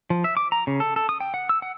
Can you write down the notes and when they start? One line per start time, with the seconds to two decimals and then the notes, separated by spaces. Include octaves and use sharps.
0.10 F3
0.24 E5
0.37 D6
0.52 A#5
0.67 C#3
0.80 A4
0.96 A4
1.09 D#6
1.20 G5
1.34 F#5
1.49 E6
1.62 F#5